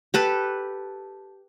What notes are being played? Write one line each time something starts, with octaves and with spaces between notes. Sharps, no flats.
G4 A4 B4